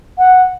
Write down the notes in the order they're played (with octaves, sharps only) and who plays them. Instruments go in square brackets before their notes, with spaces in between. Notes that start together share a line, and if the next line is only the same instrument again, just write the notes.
[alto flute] F#5